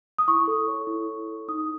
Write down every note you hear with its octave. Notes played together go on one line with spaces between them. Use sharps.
D#6
E4 C#6
A4
C#5
E4
E4
A4
D#4 D#6